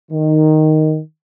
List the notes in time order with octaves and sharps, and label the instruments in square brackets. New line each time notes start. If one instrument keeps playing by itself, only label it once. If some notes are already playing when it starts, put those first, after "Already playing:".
[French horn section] D#3